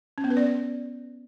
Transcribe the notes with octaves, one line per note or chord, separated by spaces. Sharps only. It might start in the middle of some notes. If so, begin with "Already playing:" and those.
C#4
B3
B4
D5